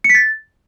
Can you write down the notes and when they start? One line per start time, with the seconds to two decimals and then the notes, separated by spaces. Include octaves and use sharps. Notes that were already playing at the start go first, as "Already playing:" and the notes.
0.04 C#7
0.10 B6
0.15 A6